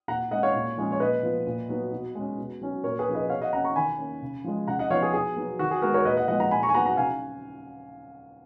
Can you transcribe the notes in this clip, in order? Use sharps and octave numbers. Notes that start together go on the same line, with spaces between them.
A#2 F#5 A#5
G#3 C#4 D#5 F#5
C#5 F5
A#2
F3 G#3 C#4
C#5
A#2 B4 D#5
F3 B3
A#2
F#3 B3
B2
G#3 C#4
B2
F#3 C#4
A#2 A#4 C#5
G#4 B4
F3 A#3 C#4
B4 D#5
B2 C#5 F5
D#5 F#5
A#3 C#4 F#5 A#5
A#5 C#6
D#3 G#5 B5
A#3 C#4
C#3
F3 G#3
C#3 F#5 A#5
D#5 F#5
F3 B3 C#5 F5
G#4
B2 G#4
F#3 B3
D#3 F#4
G#4
G#3 B3 F#4 A#4
A#4 C#5
A#2 B4 D#5
D#5 F#5
F3 G#3 B3 D#5 F#5
F#5 A#5
A#2 G#5 B5
A#5 C#6
G#5
F#3 B3 F#5 A#5
F#5 A#5
C#3 F5 G#5